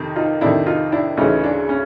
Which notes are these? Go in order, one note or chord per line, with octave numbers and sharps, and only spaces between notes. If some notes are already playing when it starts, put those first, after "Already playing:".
Already playing: F2 C3 D#3
D#4 F4
F2 C3 D#3 D4 E4
D#4 F4
D4 E4
D2 C#3 E3 C#4 D#4
D4
C#4